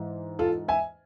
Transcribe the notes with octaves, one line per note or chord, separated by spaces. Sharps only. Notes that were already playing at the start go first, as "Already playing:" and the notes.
Already playing: G#2 E3 G#3
F4 A4
E5 G#5